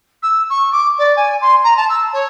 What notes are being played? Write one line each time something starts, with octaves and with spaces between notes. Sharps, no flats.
E6
C#6
D6
D5
G#5
C6
A#5
A5
E6
C#5